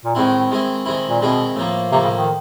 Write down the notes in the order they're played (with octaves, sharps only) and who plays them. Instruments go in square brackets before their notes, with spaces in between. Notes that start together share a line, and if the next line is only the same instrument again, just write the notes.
[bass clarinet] A#2
[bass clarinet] A2 [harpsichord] D#3 G#3 C4 E4
[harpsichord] D#3 G#3 C4 E4
D#3 G#3 C4 E4
[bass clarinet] A#2
[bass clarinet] B2 [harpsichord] D#3 G#3 C4 E4
[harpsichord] A2 F3 A#3
[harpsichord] A2 F3 A#3 [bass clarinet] C3
[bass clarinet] C#3
D#3